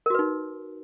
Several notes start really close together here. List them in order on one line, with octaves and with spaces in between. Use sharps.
A#4 F#4 B4 D#4